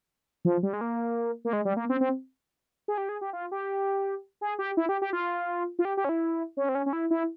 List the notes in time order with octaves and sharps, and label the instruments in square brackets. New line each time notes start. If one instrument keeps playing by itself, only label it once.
[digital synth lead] F3
G3
G#3
A#3
A#3
G#3
G3
A#3
C4
C4
G#4
G4
G#4
G4
F4
G4
G#4
G4
E4
G4
G4
F4
F4
G4
G4
C#4
E4
C#4
C4
C#4
C#4
E4
E4